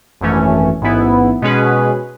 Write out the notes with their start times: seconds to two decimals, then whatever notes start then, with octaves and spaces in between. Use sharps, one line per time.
0.21 G#1 F#2 E3 A3 C#4
0.82 A1 G#2 E3 B3 E4
1.42 B2 G#3 C#4 G#4 B4